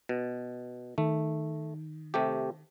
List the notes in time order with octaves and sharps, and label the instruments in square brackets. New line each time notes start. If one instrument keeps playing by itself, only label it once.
[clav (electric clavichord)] B2
[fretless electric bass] D#3 [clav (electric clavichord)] A3
[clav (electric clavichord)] C3 A3 G4